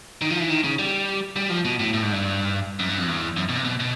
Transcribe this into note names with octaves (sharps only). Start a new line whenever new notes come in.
D#3
F3
E3
D#3
C#3
G3
G3
F3
B2
A2
A2
G#2
G2
F#2
G2
F2
E2
F#2
B2
C3
B2
B2